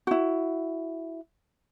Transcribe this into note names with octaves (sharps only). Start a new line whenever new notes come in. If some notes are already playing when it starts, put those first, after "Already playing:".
E4 F#4